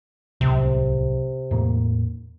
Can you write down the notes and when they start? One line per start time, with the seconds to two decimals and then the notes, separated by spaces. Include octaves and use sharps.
0.41 D1 C2 C3
1.51 E2 A2 A#3